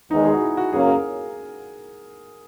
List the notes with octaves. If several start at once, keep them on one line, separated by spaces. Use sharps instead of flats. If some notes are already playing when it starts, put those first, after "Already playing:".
E2 D#3 G#3 D#4
G#4
F#4
E4
F#4
F#2 C#3 F#3 A#3 C#4 G#4
A#4